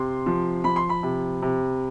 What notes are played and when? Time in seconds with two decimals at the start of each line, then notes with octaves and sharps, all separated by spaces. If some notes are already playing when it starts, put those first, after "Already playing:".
Already playing: C3 C6
0.26 F3
0.64 F3 B5
0.76 C6
0.89 B5
1.03 C3
1.42 C3